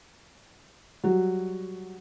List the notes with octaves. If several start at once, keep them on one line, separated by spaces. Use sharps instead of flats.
F#3 G3 F#4